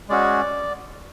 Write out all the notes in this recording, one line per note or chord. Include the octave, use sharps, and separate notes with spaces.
G#3 C#4 F#4 D5